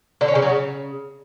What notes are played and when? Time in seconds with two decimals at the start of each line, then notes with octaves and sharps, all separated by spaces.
0.21 D3
0.28 C#4
0.35 C#3
0.42 F#3
0.49 C#3